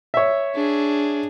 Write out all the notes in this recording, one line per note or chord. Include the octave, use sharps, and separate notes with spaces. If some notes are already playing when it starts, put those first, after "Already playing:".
C#5 E5
D4 G#4